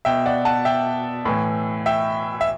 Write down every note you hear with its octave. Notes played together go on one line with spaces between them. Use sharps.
B2 E5 G5
D5 F#5
F#5 A5
E5 G5
A2 E3
E5 G5
E5